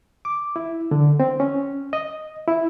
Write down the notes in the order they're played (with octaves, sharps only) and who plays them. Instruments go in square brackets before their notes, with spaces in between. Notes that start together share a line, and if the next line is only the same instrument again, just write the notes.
[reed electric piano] D6
E4
D3
C4
C#4
D#5
E4